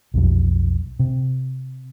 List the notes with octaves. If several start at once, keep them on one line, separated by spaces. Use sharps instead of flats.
B1 F2 F#3
C3